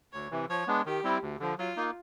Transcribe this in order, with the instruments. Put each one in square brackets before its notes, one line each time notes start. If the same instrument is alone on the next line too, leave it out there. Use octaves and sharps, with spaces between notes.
[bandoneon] D2 [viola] C#5
[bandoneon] C3 E3
[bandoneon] F3 [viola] C#5
[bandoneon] G#3 B3 D4
[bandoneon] D#3 [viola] G4
[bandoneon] G3 C4 E4
D2
D3 F3
[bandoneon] F#3 [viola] F4
[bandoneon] A#3 D#4